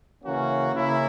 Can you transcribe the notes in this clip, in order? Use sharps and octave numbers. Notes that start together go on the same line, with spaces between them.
C#3 E3 A#3 C#4 F#4
C#3 E3 A#3 C#4 E4